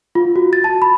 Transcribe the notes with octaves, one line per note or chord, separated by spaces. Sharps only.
F4
F#4
A6
A5
B5